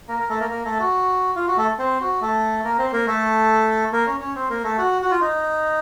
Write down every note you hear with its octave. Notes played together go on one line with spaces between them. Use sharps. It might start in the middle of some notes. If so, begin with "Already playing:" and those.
A#3 A#4
A#4
A3 A4
A#3 A#4
A#3 A#4
A3 A4
F#4
F4
F#4
A3 A4
C4 C5
F#4
A3 A4
A#3 A#4
C4 C5
A#3 A#4
A3 A4
A#3 A#4
C#4 C#5
C#4 C#5
C4 C5
A#3 A#4
A3 A4
F#4
F#4
F4
D#4